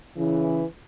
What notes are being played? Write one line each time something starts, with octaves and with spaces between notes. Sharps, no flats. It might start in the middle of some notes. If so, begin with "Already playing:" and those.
C#3 E3